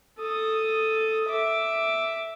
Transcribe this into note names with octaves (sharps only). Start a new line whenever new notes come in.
A4 D#6
E5 D6